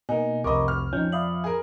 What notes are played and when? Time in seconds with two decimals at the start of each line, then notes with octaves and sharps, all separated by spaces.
0.09 B2 A#3 D#4 G#5
0.44 F1 C2 A#4 D#5 B5 C#6 D6
0.68 F6
0.93 F2 C#4 D#4 G6
1.12 D5 E5 F5 B5 D#6 F#7
1.44 G#4 A#4